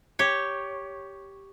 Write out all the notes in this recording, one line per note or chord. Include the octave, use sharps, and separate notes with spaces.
G4 C#5